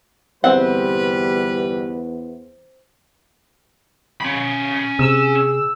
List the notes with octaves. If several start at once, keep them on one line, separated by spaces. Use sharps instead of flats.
G1 E2 G3 C4 B4 F#5
C#4 B5
C3 G#4 E6